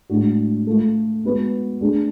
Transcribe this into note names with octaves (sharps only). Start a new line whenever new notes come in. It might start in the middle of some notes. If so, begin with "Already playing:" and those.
A2 G#3 D4 F#4
A3 F4 A4
G#3 B3 F#4 B4
A3 D4 G#4